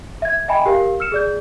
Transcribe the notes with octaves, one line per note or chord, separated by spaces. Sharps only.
E5 G#6
D#5 E5 G5 G#5 B5
G4 A#4 F5
E6 F6 C#7 E7
G#4 D5 G6